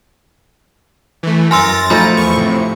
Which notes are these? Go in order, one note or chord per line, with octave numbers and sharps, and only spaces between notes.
E3 A3
F#2 A#4 G#5 C6 E6 A6 A#6
F3 A3 D#4 B5
E2 C#6
A2 C3